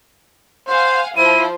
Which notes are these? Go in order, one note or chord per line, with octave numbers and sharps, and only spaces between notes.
C5 F5 F#5 G#5
F3 E4 F4 C5 D#7